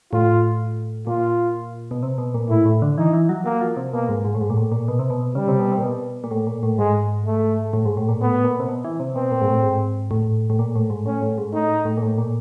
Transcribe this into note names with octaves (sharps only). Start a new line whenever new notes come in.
A2 F4
A#2 F4
B2
C3
B2
A#2
A2 E4
A2
D3
E3 D#4
E3
F#3
F#3 A#3
F3
C3
B2 A#3
G#2
G#2
A2
G#2
A#2
A2
A#2
B2
C3
B2
C#3 G3
C3
B2
C3
A#2
B2
A#2
A2
A#2
A2
G#2 G#3
A3
A2
G#2
A2
A#2
A2 B3
A#2
C3
B2
E3
C3
B2 C4
A#2
G#2
A2
G#2
A2
A2
A#2
A2
G#2
A2 C#4
A2
G#2
A2 D#4
A2
A#2
A2
A#2